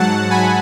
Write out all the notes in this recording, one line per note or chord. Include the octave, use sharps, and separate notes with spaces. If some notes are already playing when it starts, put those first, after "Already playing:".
Already playing: G#2 F#3 F#5 A5
G#5 B5